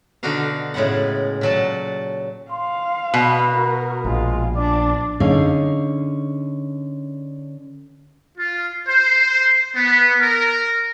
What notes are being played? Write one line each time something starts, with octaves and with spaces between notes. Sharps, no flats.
B2 D3 D4 D#4 F#4 F5
A2 C#3 G#3 B3 F#5
A#2 F#3 A5
F5 C6
B2 B4
F#4 A#4
A#1 G#3 F4
D4 D5
D3 C#4 D#4 G#4 F5
F4
C5
B3
A#4